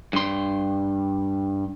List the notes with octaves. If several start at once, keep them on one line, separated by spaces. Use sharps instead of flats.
G2 C6